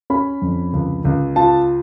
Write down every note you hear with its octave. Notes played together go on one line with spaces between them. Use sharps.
C#4 B5
F2
C#2
C#2
F4 A5